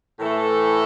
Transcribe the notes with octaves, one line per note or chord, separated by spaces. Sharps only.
A2 E3 A3 A4